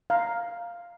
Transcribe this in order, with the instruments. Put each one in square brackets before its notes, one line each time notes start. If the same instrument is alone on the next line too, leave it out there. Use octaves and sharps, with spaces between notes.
[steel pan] F5 A#5